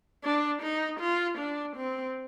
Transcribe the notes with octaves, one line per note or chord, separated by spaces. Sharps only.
D4
D#4
F4
D4
C4